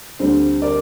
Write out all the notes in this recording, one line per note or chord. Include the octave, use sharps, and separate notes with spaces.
D2 D3 G3 C4 C5
A#4 D5